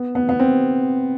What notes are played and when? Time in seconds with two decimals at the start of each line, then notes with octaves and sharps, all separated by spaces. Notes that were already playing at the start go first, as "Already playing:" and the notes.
Already playing: B3
0.15 B3
0.29 B3
0.40 C4